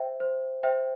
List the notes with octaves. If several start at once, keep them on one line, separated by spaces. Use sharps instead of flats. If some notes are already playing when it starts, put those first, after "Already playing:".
Already playing: C5 E5 G5
C5
C5 E5 G5